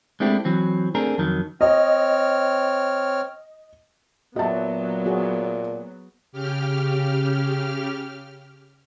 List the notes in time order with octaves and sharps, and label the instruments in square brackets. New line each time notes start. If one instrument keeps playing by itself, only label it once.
[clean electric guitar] G#3 A3 C4 D4 E4 G4
E3 F#3 C4
A3 C4 D4 G#4 A#4
F2 D#3 F#3
[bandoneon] C4 C#5 F6 [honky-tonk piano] D#5
[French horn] A#2 [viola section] F#3 B3 [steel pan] F#4 G4 [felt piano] D#5 E5 A5
[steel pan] F#4 G#4
[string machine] C#3 G4 F6